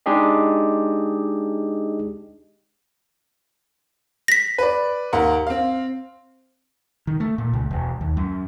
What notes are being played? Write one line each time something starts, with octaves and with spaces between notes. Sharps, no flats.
G#3 D4 D#4 G4 G#4 D#5
A#6 B6
B4 D5
D#2 A#4 F#5
C4 F5
D#3
A3
A#2
C#2
E1
D#2
F#2